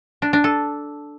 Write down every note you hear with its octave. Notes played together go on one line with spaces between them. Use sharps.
D4
D4
A4